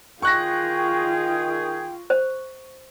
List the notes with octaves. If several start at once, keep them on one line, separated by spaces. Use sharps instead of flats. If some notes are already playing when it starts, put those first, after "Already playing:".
D#3 F4 G#4 G5 C#6 F#6 A#6
C5